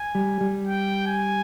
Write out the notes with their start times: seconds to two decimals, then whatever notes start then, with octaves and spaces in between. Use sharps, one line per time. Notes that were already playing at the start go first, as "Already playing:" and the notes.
Already playing: G#5
0.15 G3
0.41 G3
0.67 G5
1.07 G#5